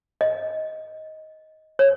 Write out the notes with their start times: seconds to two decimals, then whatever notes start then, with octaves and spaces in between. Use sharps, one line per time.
0.21 D#5
1.79 C#5